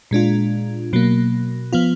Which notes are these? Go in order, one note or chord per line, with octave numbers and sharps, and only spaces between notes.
A#2 G#3 D4 F4
B2 F#3 A#3
F3 B3 F4